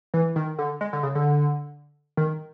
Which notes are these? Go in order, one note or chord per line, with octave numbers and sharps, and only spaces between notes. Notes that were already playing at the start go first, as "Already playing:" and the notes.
E3
D#3
D3
G#3
D3
C#3
D3
D#3